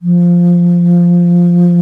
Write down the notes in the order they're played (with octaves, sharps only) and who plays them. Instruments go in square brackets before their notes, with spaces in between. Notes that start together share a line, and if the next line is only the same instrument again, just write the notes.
[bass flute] F3